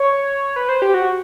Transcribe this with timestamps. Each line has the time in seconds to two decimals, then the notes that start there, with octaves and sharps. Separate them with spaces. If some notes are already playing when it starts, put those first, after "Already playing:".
Already playing: C#5
0.56 B4
0.69 C5
0.82 G4
0.94 F#4